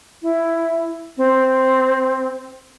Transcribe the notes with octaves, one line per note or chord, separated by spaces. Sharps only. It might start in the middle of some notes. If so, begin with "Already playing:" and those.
E4
C4